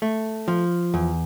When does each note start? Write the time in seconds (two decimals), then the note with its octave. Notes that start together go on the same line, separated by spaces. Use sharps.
0.02 A3
0.48 F3
0.94 E2